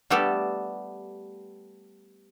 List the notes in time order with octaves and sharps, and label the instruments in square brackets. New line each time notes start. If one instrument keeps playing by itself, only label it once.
[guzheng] G3 A3 B3 G4 A4